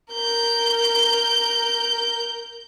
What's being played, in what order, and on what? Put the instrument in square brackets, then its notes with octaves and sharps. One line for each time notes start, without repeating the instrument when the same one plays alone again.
[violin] A#4 G6